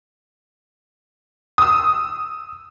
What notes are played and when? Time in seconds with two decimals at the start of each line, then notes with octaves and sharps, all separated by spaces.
1.58 D#6 E6